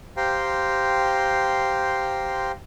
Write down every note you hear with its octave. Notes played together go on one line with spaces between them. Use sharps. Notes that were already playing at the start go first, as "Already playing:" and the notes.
G4 C5 F5 G5 A#5 C6